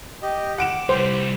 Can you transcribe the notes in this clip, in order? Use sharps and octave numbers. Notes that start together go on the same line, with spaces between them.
G4 D#5
F#5 D6 D7 E7
C2 G3 C5